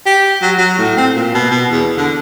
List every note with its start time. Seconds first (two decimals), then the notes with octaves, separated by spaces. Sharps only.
0.06 G4
0.42 F#3
0.58 F#3
0.78 A2
0.97 C4
1.15 A#2
1.34 B2
1.51 B2
1.71 E2
1.97 D3